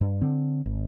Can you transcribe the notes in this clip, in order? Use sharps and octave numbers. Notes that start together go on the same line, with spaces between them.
G2
D3 C4
G#1